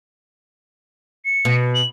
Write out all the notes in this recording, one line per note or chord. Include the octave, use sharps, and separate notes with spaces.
C#7
B2
F#7